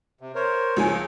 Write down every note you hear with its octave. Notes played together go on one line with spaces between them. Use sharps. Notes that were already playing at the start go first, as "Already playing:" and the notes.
C3
A#4 C5 C#5
C#2 A2 F3 G#5